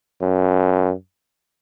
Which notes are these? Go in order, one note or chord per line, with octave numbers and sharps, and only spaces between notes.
F#2